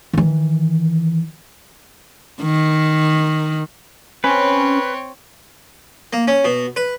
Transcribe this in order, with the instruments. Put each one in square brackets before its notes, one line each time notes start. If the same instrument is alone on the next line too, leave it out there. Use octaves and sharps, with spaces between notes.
[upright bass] D#3 E3
[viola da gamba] D#3
[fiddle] C4 C#5 [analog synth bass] C#4 [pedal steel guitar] B4
[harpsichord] A#3
C#4
B2
B4